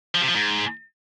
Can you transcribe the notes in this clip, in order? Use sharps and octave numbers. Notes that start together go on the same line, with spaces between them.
F3
C3
F3
G#2